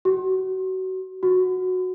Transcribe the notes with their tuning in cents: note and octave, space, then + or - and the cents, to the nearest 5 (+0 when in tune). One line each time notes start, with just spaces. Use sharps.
F#4 +25
F#4 -5